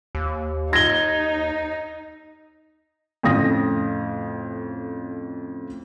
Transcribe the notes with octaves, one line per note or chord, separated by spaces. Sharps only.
D#2
D#4 G#6 A#6 G7
F2 A2 C#3 F5 D#6 A#6